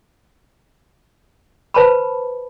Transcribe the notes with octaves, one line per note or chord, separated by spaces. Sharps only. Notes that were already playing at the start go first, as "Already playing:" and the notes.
B4 C5 A5 B5